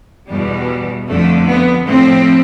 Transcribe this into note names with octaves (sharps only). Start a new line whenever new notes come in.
E2 B2 G3
F2 D3 F3 A3
B3
A2 F3 C4